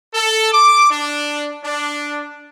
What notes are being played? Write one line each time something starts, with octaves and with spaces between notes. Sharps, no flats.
A4
D6
D4
D4